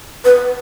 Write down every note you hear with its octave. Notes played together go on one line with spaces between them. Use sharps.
B4